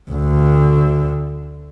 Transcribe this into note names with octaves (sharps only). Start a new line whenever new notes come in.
D2 D3